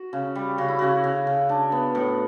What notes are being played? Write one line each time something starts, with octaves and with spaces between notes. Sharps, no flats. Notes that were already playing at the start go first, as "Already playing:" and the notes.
Already playing: F#4
C#3
G3
C#3 F#4
E4
C#3 F#4
C#3
C#3
D4
B3
A2